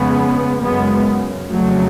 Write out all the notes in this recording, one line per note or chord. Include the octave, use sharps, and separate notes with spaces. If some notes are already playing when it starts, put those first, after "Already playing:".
Already playing: F2 C#3 G#3 B3
F#2 C#3 G#3 B3
F2 C#3 F#3 A3